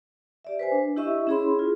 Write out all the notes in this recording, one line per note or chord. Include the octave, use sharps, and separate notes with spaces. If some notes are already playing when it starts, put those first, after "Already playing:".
G4 D5 E5
B4 C5 G#5
D4
E4 G4 D#5 E5 C#6 E6
C#4 E4 G#4 C#5 B5 C6
F4 G#4